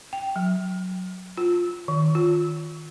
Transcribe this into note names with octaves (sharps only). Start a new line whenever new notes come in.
G5
F#3
F4
D#3
F4